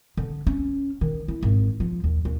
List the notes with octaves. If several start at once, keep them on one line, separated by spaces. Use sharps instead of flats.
D3
C#4
D#3
E4
G#1
F3
D#2
D#2